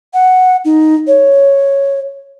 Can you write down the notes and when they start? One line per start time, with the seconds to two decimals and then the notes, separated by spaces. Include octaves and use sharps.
0.14 F#5
0.65 D#4
1.07 C#5